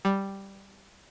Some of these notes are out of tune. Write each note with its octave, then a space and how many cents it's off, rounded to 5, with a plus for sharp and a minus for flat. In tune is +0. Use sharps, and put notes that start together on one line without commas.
G3 +0